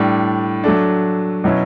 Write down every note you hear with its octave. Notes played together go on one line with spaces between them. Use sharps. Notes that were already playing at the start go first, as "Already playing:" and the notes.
Already playing: A2 G3 D4
F#3 A3 D4
B2 F#3 C#4 E4